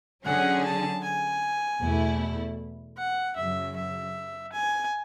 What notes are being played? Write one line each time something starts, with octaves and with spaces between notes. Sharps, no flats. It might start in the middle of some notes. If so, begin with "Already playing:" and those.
D3 F#3 C#4 G#4 F#5
A5
G#5
E2 B2 A3 E4
F#5
F#2 C#3 F#3 E5
E5
G#5